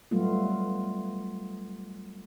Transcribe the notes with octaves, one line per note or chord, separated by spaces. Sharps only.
F#3 G3 A3 B3 F4